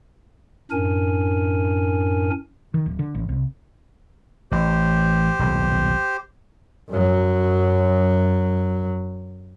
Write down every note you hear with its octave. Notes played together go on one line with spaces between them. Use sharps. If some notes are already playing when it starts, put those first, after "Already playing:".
F#2 A2 D4 A#4 G#5
D#3
D1
D3
A1
C2
A1 G4 C5
D#1 B1
F#2 F#3